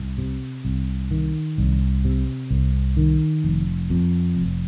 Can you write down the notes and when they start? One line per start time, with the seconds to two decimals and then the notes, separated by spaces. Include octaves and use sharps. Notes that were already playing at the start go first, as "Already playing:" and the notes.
Already playing: C2
0.18 C3
0.65 C2
1.11 D#3
1.58 C2
2.05 C3
2.51 C2
2.97 D#3
3.44 F1
3.90 F2
4.37 F1